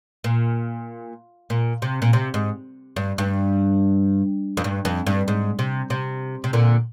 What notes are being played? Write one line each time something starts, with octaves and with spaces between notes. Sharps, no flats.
A#2
A#2
C3
A#2
C3
G#2
G2
G2
F2
G2
F2
G2
G#2
C3
C3
C3
A#2 D3